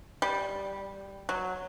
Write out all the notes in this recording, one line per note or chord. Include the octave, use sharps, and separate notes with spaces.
G3
F#3